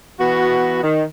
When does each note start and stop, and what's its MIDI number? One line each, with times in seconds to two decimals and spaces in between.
0.20 0.81 52
0.20 0.81 59
0.20 0.81 66
0.83 1.04 51